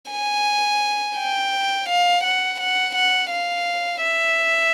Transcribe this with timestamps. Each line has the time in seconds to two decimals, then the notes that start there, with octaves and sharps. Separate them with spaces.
0.12 G#5
1.17 G5
1.89 F5
2.24 F#5
2.60 F#5
2.95 F#5
3.31 F5
4.02 E5